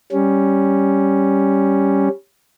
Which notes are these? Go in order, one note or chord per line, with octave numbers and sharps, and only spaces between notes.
G3 C#4